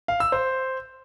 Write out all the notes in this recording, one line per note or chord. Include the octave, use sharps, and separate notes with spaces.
F5
E6
C5